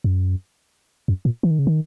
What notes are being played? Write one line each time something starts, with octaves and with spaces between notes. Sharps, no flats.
F#2
F#2
A#2
E3
D#3
C#3
D#3